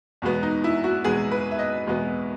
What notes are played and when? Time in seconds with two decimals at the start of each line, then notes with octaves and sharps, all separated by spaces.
0.22 E2 B2 G#3 B3 F#4
0.43 D#4
0.64 E4
0.84 F#4
1.04 E2 B2 G#3 B3 G#4
1.31 B4
1.51 E5
1.59 D#5
1.87 E2 B2 G#3 B3